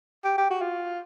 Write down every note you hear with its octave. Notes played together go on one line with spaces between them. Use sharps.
G4
G4
F#4
F4